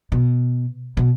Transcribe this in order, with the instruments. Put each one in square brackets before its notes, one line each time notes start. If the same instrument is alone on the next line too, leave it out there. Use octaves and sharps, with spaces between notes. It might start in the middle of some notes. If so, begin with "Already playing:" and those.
[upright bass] B2
B2